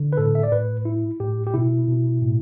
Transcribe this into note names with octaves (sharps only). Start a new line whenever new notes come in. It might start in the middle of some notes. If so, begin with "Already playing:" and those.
Already playing: D3
B4
A2 A4
E5
D5
A2 B4
E4
A2 G4
G4
B2 E4
B2
A2